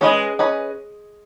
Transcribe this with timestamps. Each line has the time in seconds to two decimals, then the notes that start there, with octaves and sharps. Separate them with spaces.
0.01 G#3 C#4 G#4 B4 D#5
0.39 C#4 G#4 B4 D#5